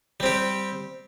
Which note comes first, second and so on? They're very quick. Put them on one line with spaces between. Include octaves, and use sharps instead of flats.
G3 C4 G4